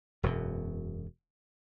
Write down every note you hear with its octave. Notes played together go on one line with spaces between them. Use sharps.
E1 F#2 B2